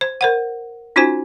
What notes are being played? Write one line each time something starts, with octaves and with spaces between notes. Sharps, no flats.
C5
A#4 C5 F#5
C#4 D#4 F4 F#4 C5 G#5